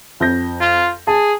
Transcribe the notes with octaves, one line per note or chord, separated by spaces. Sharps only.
F2 G6 A#6
F4
G#4 A5